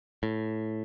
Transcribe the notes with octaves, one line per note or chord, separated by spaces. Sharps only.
A2